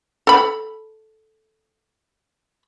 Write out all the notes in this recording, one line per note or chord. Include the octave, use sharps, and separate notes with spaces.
A4 B5